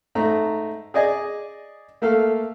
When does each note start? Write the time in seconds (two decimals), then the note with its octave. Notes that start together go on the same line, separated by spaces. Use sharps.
0.15 G#2 A3 A#5
0.94 G#4 D5 D#5 G#5
2.02 A3 A#3 A4 F5